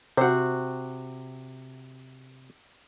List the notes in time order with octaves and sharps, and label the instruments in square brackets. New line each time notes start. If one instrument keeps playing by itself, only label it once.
[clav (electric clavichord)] C3 [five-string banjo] F#4 C5